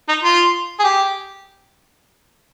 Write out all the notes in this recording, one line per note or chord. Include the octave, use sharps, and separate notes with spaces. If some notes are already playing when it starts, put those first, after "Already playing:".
D#4
F4
G#4
G4